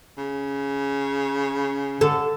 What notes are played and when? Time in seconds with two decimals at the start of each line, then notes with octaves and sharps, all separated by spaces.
0.18 C#3
2.01 D3 A4